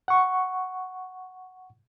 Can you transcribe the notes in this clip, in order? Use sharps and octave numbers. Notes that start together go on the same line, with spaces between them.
F#5 C#6